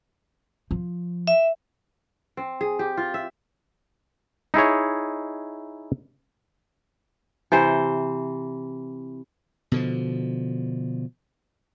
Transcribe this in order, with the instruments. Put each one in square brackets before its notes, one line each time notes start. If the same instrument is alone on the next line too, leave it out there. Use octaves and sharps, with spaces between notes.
[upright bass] F3
[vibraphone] E5
[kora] C4
G#4
G4
F4
E5
[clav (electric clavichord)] D#4 E4 G#4 C#5
[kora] C3 E3 C5
[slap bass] B2 D3 F3